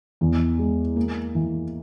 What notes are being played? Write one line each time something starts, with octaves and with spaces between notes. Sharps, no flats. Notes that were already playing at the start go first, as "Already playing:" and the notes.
E2
G#3
A#3
E3